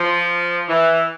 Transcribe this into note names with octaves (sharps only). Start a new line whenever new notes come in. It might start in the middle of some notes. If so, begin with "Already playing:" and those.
Already playing: F3
E3